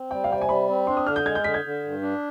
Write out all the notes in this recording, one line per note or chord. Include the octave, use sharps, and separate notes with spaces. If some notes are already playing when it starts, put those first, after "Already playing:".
Already playing: C4
G3 G5
F5
C3 G5
G#5
G3 B5
C4
D4 C6
D#6
D3 F6
G6
G#3 G#6
G6
D3 B6
G#6
D3
G2
D4